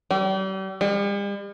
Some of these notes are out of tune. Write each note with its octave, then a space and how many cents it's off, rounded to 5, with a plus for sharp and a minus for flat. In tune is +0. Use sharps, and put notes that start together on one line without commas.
G3 -40
G3 +45